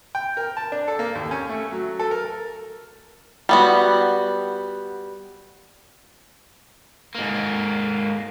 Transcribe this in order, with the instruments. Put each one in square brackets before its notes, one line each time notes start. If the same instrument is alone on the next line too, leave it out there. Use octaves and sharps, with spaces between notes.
[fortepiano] G5
A#4
A5
D4
A4
A#3
D#2
C#4
A3
F#3
A4
A#4
[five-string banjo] G3 B3 F#4
[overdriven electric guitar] G#2 A#3